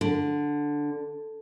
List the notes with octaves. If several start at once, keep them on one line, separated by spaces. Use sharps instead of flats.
D3